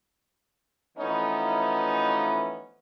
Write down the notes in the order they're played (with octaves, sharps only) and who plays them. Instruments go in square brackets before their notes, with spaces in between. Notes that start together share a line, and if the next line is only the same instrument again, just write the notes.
[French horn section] E3 F3 A3 B3 C#4 D#4